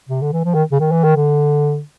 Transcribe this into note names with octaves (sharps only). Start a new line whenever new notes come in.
C3
D3
E3
F3
D#3
C#3
D#3
E3
D#3
D3